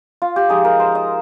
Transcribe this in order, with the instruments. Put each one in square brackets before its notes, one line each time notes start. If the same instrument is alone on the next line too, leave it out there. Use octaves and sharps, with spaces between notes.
[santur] F4
G4
F3 G#3 D#4 G#4
A#4
C5
D#5